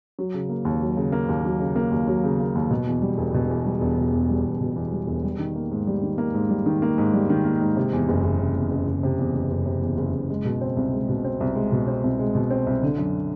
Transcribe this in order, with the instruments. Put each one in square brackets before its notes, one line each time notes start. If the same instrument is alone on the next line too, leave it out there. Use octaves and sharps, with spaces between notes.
[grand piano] F#3
C#3
A#3
D#2
F#3
C#3
A#3
D#2
F#3
C#3
A#3
D#2
F#3
C#3
A#3
D#2
B2
E2
G3
E1
B2
E2
G3
E1
B2
E2
G3
E1
B2
E2
G3
E1
G3
D#3
A#3
G#2
G3
D#3
A#3
G#2
G3
D#3
A#3
G#2
G3
D#3
A#3
G#2
C3
E2
F#1
F#1
C3
E2
F#1
F#1
C3
E2
F#1
F#1
C3
E2
F#1
F#1
G#3
B2
C4
C2
G#3
B2
C4
C2
G#3
B2
C4
C2
G#3
B2
C4
C2
D3
F#2